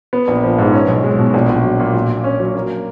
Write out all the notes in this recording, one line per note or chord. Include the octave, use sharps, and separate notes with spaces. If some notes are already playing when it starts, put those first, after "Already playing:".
B3
A#1
F3
G#2
C#4
B1
G#3
B2
A#1
A#1
F#3
A#2
A#2
A#2
C#4
F#3
A#3